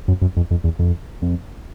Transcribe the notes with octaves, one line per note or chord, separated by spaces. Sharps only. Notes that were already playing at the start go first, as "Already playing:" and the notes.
F#2
F#2
F2
F2
E2
F2
F2